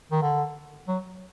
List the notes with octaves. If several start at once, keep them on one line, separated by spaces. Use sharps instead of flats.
D#3
D3
F#3